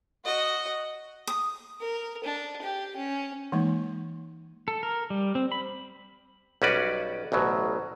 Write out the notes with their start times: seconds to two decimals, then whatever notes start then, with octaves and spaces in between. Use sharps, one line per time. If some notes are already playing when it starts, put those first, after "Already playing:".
0.25 F#4 D#5
1.27 D#6
1.81 A#4
2.24 D4
2.62 G4
2.96 C#4
3.52 E3 G#3 A#3 D#4
4.68 A4
4.83 A#4
5.10 G3
5.35 C4
5.52 B5
6.62 B1 G3 C#4 F#4 B4 D5
7.32 A1 D2 B2 F#3